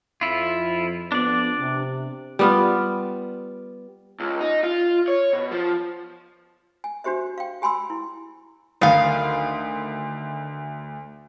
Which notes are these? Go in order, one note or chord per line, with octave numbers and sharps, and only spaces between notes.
F2 E4 F4
F2 B3 D4 D5
C3
G3 B3 F4
C#2
D#4
F4
C#5
B2
F3
G#5
D4 F#4 G4 C5 E5
F5 G5
G4 G#5 B5 C6 E6
E4
D2 D#3 F5 B5 D#6